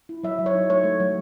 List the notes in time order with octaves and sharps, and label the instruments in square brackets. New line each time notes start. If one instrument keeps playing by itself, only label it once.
[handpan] E4
F#3 E5
F#3
C#5
D#4
A3 C#5
A3
F#3